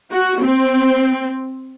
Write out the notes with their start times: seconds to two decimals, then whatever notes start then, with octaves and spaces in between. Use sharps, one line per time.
0.11 F#4
0.42 C4